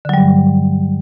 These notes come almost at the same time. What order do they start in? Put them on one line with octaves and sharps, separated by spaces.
D3 F#3 G3 G2